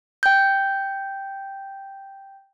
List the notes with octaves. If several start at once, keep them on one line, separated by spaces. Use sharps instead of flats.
G5 G6